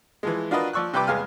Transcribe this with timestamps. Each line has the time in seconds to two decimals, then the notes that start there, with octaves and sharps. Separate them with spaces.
0.23 E3 F3 G#3
0.51 D4 F4 F#4 A#4 B4 D#5
0.73 F3 D5 C#6 E6 F#6
0.93 C3 G3 G4 B4 G5 D6
1.07 E2 G#3 B3 F5 G#5 F6